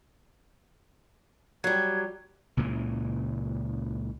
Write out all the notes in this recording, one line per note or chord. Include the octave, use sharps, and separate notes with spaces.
F#3 G3 G#6
C#2 A#2 C#3 E3